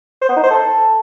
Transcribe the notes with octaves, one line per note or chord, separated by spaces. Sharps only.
C5
B3
D#4
C5
A4